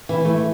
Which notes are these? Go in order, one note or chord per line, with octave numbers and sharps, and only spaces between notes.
E3
A3